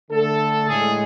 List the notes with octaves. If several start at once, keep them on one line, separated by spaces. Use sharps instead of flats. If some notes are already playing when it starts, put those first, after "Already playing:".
D3 A3 A4
A2 G#3 G#4